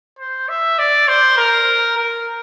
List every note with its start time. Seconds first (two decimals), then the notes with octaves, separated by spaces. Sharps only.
0.19 C5
0.49 E5
0.79 D5
1.08 C5
1.37 A#4
1.97 A#4